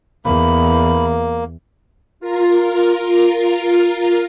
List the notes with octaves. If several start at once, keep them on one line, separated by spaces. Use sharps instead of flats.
E2 A#3 B5
F4 A#4